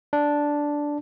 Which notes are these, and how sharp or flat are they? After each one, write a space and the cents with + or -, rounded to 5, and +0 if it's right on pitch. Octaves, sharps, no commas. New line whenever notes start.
D4 -5